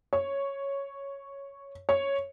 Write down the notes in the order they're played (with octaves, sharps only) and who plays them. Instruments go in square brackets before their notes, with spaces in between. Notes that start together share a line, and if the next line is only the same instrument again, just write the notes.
[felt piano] C#5
C#5